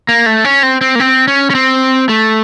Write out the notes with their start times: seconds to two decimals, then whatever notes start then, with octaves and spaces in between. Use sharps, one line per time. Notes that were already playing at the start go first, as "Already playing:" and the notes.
0.09 A#3
0.26 A3
0.44 C#4
0.63 C4
0.81 C4
0.95 A#3
1.00 C4
1.28 C#4
1.50 C#4
1.55 C4
2.09 A3